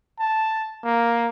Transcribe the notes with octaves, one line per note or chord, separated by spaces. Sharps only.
A5
A#3